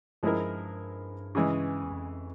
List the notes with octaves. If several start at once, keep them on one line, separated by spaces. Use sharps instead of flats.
G2 F3 G#3 E4 A#4
C#3 E3 G#3
E2
F2